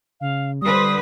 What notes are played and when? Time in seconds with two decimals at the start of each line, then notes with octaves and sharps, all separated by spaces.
0.21 C#3 F5
0.62 D3 G3 B4 C5 D#6